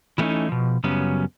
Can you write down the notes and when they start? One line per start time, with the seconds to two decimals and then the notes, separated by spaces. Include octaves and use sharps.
0.18 E3 G3 A3 A#3 C#4 D#4
0.49 B2 F3
0.84 F#2 C#3 F#3 G3 B3 C#4